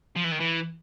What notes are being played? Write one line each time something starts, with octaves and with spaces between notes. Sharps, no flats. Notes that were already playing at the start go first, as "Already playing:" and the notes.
F3
E3
D#3
E3